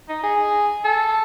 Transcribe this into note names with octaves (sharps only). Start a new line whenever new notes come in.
D#4
G#4
A4